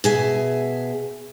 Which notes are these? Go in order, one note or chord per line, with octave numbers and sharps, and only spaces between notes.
B2 G#4 E5